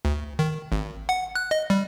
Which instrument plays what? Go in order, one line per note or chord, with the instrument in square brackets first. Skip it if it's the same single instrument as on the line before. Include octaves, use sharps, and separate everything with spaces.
[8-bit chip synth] D2
D#3
G#1
F#5
F#6
D#5
G3